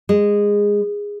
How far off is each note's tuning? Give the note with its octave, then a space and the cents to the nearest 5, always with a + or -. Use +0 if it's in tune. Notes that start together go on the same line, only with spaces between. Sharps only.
G#3 -15